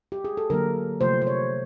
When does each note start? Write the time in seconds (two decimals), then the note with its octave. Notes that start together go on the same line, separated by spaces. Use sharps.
0.12 G4
0.25 G#4
0.37 A4
0.50 D3 F#3 A#3 A#4
1.01 C3 F3 A3 C5
1.22 C5
1.27 C#5